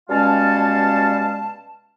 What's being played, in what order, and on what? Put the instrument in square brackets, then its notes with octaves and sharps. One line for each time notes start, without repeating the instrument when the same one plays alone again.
[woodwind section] B2 G3 G#3 C#4 F5 A5